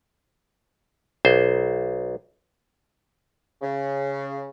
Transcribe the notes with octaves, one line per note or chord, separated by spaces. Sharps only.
B1 C5
C#3